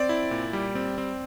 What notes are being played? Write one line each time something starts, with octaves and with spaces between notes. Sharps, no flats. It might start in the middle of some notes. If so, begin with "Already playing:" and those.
Already playing: C4 D5
E4
A#2
G3
C4
C4